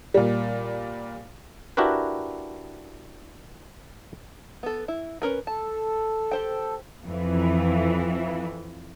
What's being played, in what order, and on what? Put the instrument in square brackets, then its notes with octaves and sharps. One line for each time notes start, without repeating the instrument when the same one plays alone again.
[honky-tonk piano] A#2 G3
[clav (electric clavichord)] D4 E4 F#4 G4 A#4 B4
[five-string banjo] B3 A4
E4
C#4 A#4 B4
[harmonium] A4 [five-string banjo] A5
[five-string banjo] G4 C5 G5
[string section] F2 E3